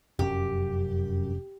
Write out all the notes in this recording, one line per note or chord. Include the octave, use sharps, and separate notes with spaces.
F1 F#2 A#2 C#4 G4